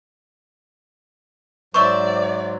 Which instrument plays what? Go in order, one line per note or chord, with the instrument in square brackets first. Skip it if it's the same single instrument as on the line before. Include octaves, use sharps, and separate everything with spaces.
[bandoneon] G#2 F#3 [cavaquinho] C5 E5 [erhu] D5 [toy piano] C#6